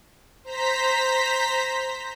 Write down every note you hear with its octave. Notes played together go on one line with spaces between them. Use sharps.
C5 A#5 B6